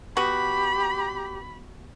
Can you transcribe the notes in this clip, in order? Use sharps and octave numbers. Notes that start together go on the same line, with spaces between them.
B3 F#4 G4 B5